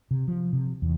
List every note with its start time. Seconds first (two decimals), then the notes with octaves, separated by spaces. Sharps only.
0.11 C3
0.28 F3
0.53 C3
0.82 E2